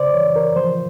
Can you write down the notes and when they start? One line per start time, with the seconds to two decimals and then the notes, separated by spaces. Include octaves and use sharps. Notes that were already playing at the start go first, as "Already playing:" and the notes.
Already playing: C#3 C5 D5
0.14 E3 C#5
0.36 A#4
0.56 F3 C5